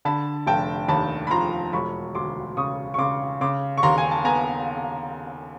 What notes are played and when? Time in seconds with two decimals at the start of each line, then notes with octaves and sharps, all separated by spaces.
0.05 D3 A5 B5
0.47 F1 G5 A5
0.88 D#2 A5 B5
1.27 B5
1.31 F3 A#5 C6
1.73 E1 B5 C#6
2.15 D2 C6 D6
2.57 C#3 C#6 D#6
2.94 C#6
2.98 C#3 C6 D6
3.41 C#3 C6 D6
3.78 C#6
3.83 D#2 A#5 C6
3.98 G#5
4.11 A5
4.24 B3 G#5 A#5